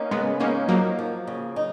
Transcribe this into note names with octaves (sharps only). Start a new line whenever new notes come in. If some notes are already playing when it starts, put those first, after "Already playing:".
Already playing: A#3 C#4 D#4
C#3 G#3 B3
A#3 C#4 D#4
F3 F#3 A#3
F3
C#3
D#4